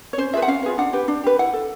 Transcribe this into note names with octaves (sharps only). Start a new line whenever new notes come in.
C#5
C#4 C5
F4 G#4 B4 E5
F#5
C#4 F5
F4 G#4 B4
D4 F#5
G4 B4
D4
G4 B4
E4 F#5
A4